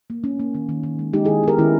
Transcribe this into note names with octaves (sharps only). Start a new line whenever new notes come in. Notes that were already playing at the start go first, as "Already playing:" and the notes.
A#3
A#3 C#4
A#3
D#3
D#3
D#3
G#3
G#3 D#4 G4
E4 G#4
D#3
B3 G4 A#4
D#3 C#4 E4